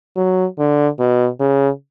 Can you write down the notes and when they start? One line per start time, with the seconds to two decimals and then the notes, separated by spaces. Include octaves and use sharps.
0.16 F#3
0.59 D3
0.99 B2
1.40 C#3